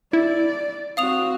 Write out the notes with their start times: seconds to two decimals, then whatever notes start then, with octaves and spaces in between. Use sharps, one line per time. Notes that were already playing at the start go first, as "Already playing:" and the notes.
0.13 E4 D5
0.97 C4 F#4 F5 D#6 F7